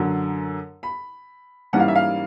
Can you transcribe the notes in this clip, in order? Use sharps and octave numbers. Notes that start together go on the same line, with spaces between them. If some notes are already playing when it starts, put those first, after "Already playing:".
Already playing: F#2 D3 F#3
B5
G#2 E3 G3 A#3 C#4 F#5
F5
E5
F5